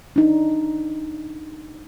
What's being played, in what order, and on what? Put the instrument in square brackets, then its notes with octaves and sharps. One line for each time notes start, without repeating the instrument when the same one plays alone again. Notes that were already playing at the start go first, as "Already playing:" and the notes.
[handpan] D4 D#4